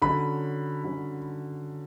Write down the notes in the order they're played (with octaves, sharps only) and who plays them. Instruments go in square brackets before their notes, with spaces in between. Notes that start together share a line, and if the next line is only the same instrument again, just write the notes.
[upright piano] D3 F#3 C#4 [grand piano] B5
[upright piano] D3 F#3 C#4